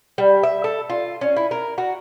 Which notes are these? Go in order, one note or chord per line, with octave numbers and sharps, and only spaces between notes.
G3
E5
A4
F4
C#4
E4
A#4
F#4